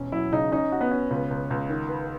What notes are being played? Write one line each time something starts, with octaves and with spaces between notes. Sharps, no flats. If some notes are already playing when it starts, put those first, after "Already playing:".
Already playing: E1 C#4
F#3 E4
C#3 D#4
C#4 D#4
F#4
B3
C#4
C#2
C#2
C#2
D#3
B4